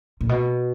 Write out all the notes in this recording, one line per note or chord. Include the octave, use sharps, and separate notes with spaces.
A#2
B2